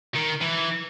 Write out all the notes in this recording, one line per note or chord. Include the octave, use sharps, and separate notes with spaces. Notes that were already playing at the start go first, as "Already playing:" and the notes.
D#3
E3